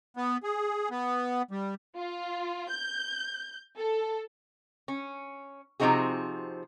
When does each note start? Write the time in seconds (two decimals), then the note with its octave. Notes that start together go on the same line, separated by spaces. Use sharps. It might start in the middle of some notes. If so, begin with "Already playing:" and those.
0.17 B3
0.43 G#4
0.91 B3
1.51 G3
1.96 F4
2.69 G6
3.77 A4
4.88 C#4
5.80 C3 F3 C4 D#4 F#4 G#4